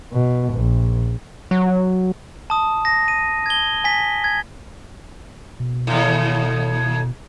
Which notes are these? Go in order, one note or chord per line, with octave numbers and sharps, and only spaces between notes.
B2
A#1
F#3
A5 D#6
A#6
D#7
G#6 G7
G#5 B6
G#6
B2
D#2 A2